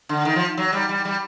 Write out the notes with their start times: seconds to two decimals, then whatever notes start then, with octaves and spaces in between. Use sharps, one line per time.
0.09 D3
0.25 D#3
0.36 F3
0.58 F#3
0.73 G3
0.89 G3
1.05 G3